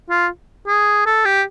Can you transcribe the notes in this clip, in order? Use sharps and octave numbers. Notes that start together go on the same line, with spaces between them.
F4
G#4
A4
G4